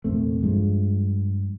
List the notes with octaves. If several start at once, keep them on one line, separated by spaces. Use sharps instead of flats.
A#1 E2 C3 A3
G2 F3 G#3